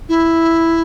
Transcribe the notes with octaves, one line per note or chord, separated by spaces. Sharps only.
E4